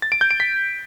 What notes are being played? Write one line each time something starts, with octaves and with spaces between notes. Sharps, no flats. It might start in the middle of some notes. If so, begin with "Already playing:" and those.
A6
D7
G6
D7
B6